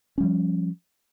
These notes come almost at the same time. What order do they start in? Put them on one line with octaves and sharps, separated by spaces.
C#4 G3 F3